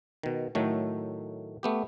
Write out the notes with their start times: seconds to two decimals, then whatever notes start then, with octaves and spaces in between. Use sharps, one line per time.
0.23 B2 D#3
0.55 A2 D#3 F#3 A3
1.63 A3 B3 G4